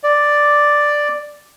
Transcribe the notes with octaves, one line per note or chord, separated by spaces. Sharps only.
D5